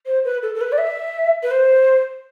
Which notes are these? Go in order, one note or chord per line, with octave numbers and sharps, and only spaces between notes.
C5
B4
A4
A4
B4
D5
E5
B4
C5